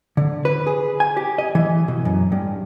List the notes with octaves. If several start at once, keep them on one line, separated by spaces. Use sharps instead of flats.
D3
B4
G#4
G#5
G4
D#5
E3
B2
F#2
G2